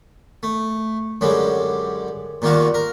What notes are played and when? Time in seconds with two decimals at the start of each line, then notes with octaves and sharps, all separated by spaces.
0.43 A3
1.21 F#2 D3 G3 G#3
2.42 A#2 D#3 G3 F4 F#4
2.74 A#4